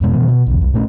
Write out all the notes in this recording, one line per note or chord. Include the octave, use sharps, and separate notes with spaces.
F1 B2 G#3
B2 D#3 E3 B3
B2
B1 E2
C2
A#2 A3 C#4